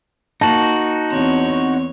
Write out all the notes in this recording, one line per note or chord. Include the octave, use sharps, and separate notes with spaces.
A#3 D#4 F#4 A5
E2 C4 C#5